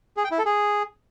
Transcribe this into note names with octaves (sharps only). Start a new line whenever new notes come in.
G#4
G5
E4
A4
G#4